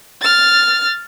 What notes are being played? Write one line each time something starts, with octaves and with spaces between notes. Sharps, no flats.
F6 A6